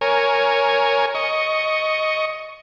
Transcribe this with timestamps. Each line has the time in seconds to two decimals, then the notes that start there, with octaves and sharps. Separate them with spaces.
0.01 A#4 C#5 G#5
1.15 D#5 C#6